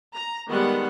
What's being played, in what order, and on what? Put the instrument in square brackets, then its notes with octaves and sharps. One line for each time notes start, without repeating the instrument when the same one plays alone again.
[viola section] A#5
D#3 G3 G#3 B3 F#5